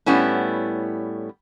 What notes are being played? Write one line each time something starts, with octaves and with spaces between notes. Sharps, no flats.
A2 G3 B3 C#4 E4